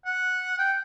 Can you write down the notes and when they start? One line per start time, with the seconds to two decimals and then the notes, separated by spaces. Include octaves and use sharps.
0.05 F#5
0.59 G5